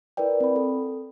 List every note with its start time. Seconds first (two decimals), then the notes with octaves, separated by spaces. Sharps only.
0.17 E4 A#4 B4 D5 G5
0.40 C4 B5
0.56 A4